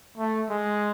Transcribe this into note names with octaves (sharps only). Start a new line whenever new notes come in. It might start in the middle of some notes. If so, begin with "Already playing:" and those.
A3
G#3